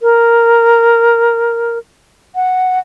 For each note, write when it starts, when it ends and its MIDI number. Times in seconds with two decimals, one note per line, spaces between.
0.01 1.78 70
2.35 2.79 78